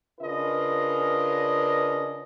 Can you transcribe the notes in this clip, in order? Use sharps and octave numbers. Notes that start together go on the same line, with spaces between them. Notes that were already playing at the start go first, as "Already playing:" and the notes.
C#3 D4 F4 A#4 B4 D#5